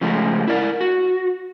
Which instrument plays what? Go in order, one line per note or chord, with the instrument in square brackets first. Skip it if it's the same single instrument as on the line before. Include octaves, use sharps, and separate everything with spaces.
[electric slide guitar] C#3 F3 G#3 A3
E4 A#4 D5
F#4